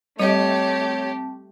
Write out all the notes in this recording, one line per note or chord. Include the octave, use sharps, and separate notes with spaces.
G3 A3 C4 G4 C#5 D#5 A5